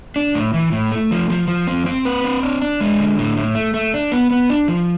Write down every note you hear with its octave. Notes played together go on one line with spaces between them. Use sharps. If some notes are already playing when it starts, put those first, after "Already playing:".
D4
A2
E3
A2
A3
F3
F3
F3
C4
C4
B4
C4
D4
D4
G#3
D3
A2
A2
A3
A3
D4
B3
B3
D4
F3